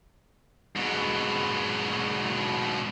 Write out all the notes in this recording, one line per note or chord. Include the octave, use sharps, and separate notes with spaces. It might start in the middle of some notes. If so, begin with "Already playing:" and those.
G#2 B2